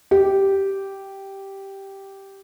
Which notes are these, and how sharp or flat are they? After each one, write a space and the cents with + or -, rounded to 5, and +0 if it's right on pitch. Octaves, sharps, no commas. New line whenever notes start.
G4 -5